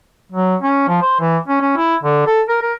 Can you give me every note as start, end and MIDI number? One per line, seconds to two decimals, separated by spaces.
0.32 0.56 54
0.62 0.86 61
0.88 0.98 53
1.02 1.18 72
1.20 1.38 52
1.48 1.61 61
1.61 1.75 61
1.77 1.96 64
2.03 2.24 50
2.27 2.41 69
2.49 2.58 70
2.62 2.74 70